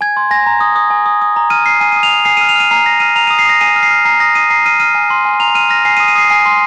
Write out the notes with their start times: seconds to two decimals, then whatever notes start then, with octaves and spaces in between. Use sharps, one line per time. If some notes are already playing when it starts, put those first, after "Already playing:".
0.01 G#5 G#6
0.17 C6
0.31 G#5 A#6
0.46 A#5
0.61 D#6
0.76 D#6
0.90 G#5
1.06 D#6
1.22 D#6
1.36 A#5
1.50 F6 D#7
1.65 F6 C7
1.81 G#5 D#7
1.92 D#7
1.96 D#6
2.03 F7
2.10 D#6
2.25 G#5 C7
2.37 D#7
2.41 F6
2.49 F7
2.56 F6 D#7
2.71 A#5 C7
2.85 F6 A#6
3.00 F6 D#7
3.16 A#5 F7
3.27 D#7
3.30 D#6
3.39 C7
3.45 D#6 A#6
3.61 G#5 D#7
3.76 F6
3.83 C7
3.91 F6
4.05 A#5 C7
4.20 D#6 A#6
4.35 D#6 D#7
4.50 A#5 C7
4.65 F6 D#7
4.80 F6 D#7
4.95 G#5
5.10 C6
5.25 G#5
5.40 A#5 F7
5.55 F6 D#7
5.69 F6 A#6
5.85 G#5 C7
5.97 D#7
6.00 D#6
6.08 D#7
6.15 D#6 C7
6.30 G#5 C7
6.46 C6